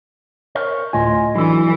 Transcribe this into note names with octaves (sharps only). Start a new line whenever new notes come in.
A#4 C5 C#5
D2 A2 F4 D#5 G#5
E3 F#3 D4 E4 A4